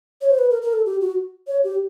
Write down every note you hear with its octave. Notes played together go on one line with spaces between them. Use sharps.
C#5
C5
B4
A#4
A#4
A4
G4
F#4
C#5
G4